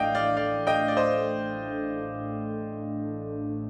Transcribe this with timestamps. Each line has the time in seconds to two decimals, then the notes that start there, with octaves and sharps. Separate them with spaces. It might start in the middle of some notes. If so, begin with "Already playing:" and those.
Already playing: A1 A2 A3 D4 D5 D#5 F5 G5
0.15 D5 F5
0.37 D5 F5
0.67 D#5 G5
0.88 D5
0.97 C5 D#5